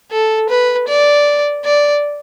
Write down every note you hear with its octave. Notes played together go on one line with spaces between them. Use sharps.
A4
B4
D5
D5